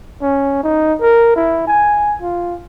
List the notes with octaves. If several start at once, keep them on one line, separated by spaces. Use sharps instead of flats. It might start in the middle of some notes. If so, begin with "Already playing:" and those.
C#4
D#4
A#4
E4
G#5
F4